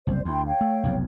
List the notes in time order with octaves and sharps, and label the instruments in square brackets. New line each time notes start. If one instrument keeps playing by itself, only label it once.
[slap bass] F#1 C2 [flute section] C5 D5
[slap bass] D2 [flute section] E4 G5 C6
[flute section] C#5 F5 G5
[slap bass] A3
F1 B1 F2